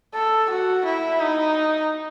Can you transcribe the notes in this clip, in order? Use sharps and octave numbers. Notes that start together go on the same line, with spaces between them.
A4
F#4
E4
D#4